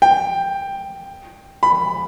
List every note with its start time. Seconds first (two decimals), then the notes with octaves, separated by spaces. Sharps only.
0.02 G5
1.63 B5